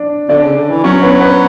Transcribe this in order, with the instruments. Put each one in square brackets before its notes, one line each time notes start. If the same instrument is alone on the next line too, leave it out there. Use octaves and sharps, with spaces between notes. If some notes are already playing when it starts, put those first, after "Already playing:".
Already playing: [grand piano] D4 D5
[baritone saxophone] D3 [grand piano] D4 D5
[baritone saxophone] C#3
D3
E3
[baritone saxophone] F#3 [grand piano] C#4 C#5
[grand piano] B3 B4
B3 B4